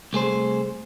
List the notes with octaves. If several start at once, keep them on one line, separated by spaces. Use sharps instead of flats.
C2 A3 G#4 C5